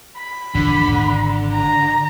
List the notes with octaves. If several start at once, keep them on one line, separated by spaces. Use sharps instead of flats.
B5
D#1 E2 D3 F3
G#1
A#5